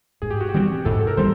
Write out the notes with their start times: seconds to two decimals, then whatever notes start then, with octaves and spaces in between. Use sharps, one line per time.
0.22 G#2 G#4
0.31 G4
0.41 F#4
0.49 G4
0.54 E3 G3 C4
0.85 G#2 A4
1.01 A4
1.07 A#4
1.17 E3 G3 C4 C5